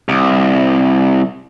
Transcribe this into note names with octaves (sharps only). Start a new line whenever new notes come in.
C2